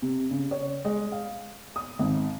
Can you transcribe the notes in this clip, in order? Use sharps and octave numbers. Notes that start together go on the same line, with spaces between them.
C3
C#3
C#5
G#3
F5
D#6
G#1